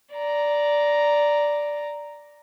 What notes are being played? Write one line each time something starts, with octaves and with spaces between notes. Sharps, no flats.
D5 A#5